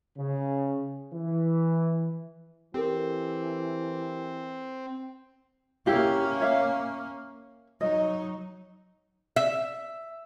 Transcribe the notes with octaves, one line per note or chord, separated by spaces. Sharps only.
C#3
E3
E3 C4 G4 A4 A#4
A#3 C#4 E4 G4 F5
C#5 E5 F5
F#3 D#4 D#5
E5